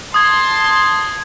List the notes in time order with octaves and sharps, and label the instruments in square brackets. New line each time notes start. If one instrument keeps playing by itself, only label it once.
[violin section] A5 C6 [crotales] D#6 G#6